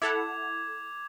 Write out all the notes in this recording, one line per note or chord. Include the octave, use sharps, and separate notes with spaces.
E4 A4 F#5 D6 G#6 F7